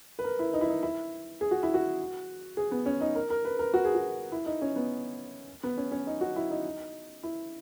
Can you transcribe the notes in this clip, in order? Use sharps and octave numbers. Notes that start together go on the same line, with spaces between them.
B4
A#4
E4
D#4
E4
D#4
E4
G#4
F#4
E4
F#4
G#4
B3
C#4
D#4
A#4
A#4
B4
A#4
F#4
G#4
F#4
E4
D#4
C#4
B3
B3
C#4
C#4
D#4
F#4
E4
D#4
E4